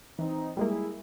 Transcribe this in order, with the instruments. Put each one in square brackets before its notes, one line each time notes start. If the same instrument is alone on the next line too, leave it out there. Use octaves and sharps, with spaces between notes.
[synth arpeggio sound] E3 [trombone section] C4 D#4
[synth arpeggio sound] G3 G#3 A#3 [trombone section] E4 G#4